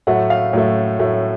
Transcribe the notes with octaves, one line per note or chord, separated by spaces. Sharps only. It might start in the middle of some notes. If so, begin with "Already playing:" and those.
A2 F#3 A3 F#5
F5
A2 F#3 A3
A2 F#3 A3